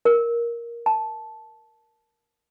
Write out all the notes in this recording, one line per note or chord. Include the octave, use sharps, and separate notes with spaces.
A#4
A5